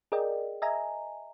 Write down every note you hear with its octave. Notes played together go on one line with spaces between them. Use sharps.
G#4 A#4 D5 D#5 G5
D#5 E5 G#5 A#5